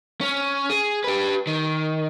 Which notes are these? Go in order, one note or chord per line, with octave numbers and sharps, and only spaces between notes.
C#4
G#4
G4 B4
D#3